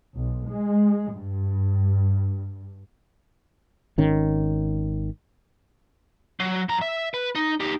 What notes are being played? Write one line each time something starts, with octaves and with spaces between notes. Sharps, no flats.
B1
G#3
G2
G#1 D#3 C#4
F#3
F#2 A#5
E5
B4
D#4
D#4 G4